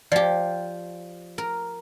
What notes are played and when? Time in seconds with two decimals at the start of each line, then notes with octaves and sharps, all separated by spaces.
0.12 F3 G4 D5
1.38 A#4